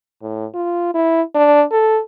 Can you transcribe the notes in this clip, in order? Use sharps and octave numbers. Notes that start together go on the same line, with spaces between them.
A2
F4
E4
D4
A4